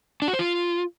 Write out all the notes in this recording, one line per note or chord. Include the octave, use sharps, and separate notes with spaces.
D4
F#4
C5
F4